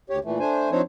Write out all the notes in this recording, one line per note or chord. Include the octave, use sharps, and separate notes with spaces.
D2 G4 C#5
A#2 E3 A3
A3 D4 C5 G#5
F3 C4 D4 D#4 C5 C#5